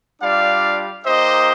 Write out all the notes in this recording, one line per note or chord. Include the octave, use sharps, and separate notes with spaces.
G3 D4 F4 D5 F5
A#3 D#4 G4 C5 D#5